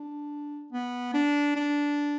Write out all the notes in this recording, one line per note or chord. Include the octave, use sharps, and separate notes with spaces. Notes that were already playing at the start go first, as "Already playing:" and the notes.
Already playing: D4
B3
D4
D4